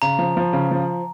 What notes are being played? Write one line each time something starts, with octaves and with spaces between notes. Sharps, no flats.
C#3 A#5
F3
F3
C#3
F3